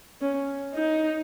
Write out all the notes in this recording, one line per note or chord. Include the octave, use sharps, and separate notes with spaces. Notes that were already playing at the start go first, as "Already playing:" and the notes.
C#4
D#4